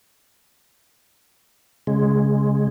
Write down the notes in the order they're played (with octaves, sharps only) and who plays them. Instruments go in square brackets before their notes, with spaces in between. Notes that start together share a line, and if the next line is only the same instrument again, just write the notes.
[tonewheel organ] C#3 G#3